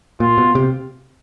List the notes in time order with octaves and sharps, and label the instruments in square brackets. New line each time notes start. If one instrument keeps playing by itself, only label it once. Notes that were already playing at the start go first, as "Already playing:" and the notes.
[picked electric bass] A#2 [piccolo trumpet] F4
[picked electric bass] B2
C3